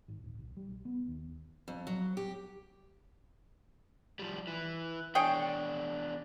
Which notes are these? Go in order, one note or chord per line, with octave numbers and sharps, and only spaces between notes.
G#1
D1
B1
G3
B1
B3
D#2
F2
F#3
G4
F3 G3
E3
E2 D4 G#4 C#5 G5